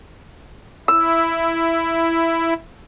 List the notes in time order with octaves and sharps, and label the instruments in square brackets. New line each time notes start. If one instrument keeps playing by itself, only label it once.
[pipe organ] E4 [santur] E6